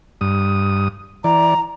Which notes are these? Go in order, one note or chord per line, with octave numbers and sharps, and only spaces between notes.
G2 D#6
E3 D5 A#5